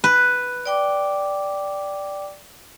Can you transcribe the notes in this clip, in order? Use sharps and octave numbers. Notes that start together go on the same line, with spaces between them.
B4
D5 G5 D6